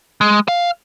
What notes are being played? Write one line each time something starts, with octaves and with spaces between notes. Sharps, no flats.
G#3
F5